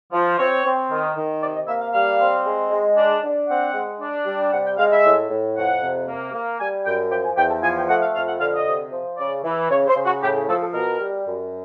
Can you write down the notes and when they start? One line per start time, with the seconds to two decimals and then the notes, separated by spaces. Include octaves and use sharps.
0.12 F3
0.38 C4 C#5
0.64 C4
0.90 D#3
1.15 D#3
1.41 C3 D5
1.54 D#5
1.67 A#3 E5
1.80 F5
1.93 G3 F5
2.19 C4
2.45 G#3
2.71 G#3
2.97 D4
3.23 D4
3.48 C4 F#5
3.74 G#3
4.00 D4
4.26 G3
4.52 C3 F#5
4.65 G5
4.78 G#3 F5
4.91 E5
5.04 A2
5.30 A2
5.56 F2 F#5
5.81 C3
6.08 A#3
6.33 A#3
6.59 G3 G#5
6.85 F#2 G5
7.11 F3 G5
7.24 G#5
7.36 E2 G5
7.50 A5
7.62 F3 G#5
7.75 G5
7.88 A3 F#5
8.02 F5
8.14 F2 F5
8.27 F#5
8.40 D3 F5
8.53 D#5
8.66 C3
8.92 F3
9.17 C#3 D5
9.44 E3
9.69 C#3 C#5
9.87 C5
9.95 C#3
10.04 F#4
10.21 A2 G4
10.34 G#4
10.47 F3 A4
10.61 A4
10.73 B2 A#4
10.99 G3
11.25 F#2